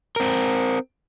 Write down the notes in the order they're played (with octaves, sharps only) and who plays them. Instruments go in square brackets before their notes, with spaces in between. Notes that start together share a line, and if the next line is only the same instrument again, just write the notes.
[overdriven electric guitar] C4 A#4